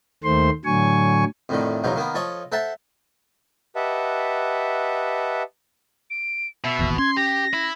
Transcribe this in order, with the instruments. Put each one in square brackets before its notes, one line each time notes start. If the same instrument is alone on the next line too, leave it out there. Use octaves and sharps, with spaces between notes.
[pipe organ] D#2 D#3 A3 C5 C6
A2 D3 F#3 G#5 C#6
[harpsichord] F2 A2 D3 D#3
E2 G#2 B2 F3 F#3
D#3 A#3 B3
F3 A4 C#5 D#5
A4 C5 E5 F#5 A5
[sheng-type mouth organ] G4 B4 D#5 E5 F#5 A5
[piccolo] D7
[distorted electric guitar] B2 [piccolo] E5
[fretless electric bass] E1 A1 D#2
[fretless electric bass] C#4 [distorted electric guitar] C6 [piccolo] G#6
[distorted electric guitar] G4 [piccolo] A#6
[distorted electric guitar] E4